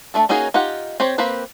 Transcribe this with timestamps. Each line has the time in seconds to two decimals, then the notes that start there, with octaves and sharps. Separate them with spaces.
0.14 A3 D4 A4
0.29 A#3 C#4 D#4 F#4 G#4
0.54 D#4 F4 G4 F#5
1.00 C4 G4 C5 C#5
1.18 A#3 C4 G4 B4